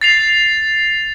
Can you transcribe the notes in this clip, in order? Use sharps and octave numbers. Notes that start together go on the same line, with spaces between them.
A6 C7 F7